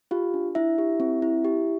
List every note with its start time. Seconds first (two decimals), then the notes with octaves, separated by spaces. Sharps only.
0.11 F4 G4 F5
0.34 D4
0.55 D4 E4 E5
0.78 G4
1.00 C4
1.22 E4
1.45 G4